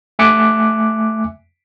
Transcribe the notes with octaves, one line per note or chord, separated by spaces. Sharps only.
A3 E5 G#5 D6 F#6 C#7